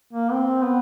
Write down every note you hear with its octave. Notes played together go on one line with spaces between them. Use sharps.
A#3
C4
B3